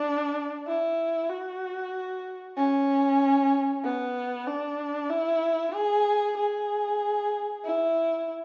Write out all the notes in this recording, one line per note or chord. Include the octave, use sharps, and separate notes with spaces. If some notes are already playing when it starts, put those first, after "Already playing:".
Already playing: D4
E4
F#4
C#4
B3
D4
E4
G#4
G#4
E4